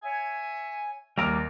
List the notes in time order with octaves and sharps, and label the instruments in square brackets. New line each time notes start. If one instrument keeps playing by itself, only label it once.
[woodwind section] C#5 E5 G#5
[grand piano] D#2 E6 F6 [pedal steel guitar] G3 A#5 D6